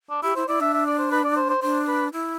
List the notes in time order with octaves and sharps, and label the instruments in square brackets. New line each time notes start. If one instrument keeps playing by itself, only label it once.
[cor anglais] D4
[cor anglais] E4 [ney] G4
[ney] E4 [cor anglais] C5
[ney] E4 [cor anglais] D5
[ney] D4 [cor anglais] E5
[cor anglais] E5
D5
C5
B4
D5
C5
C5
[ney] D4 [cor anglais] C5
[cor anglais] B4
[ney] E4